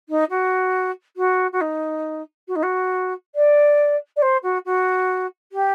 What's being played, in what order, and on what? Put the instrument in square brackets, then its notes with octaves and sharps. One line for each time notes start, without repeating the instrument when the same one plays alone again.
[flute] D#4
F#4
F#4
F#4
D#4
F#4
D#4
F#4
D5
D5
C5
F#4
F#4
G4